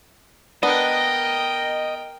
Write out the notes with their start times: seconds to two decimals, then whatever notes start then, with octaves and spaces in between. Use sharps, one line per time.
0.63 B3 D4 A#4 D#5 G5